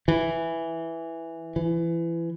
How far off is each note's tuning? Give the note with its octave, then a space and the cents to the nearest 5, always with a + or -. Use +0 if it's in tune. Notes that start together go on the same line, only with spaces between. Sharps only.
E3 +0
E3 +25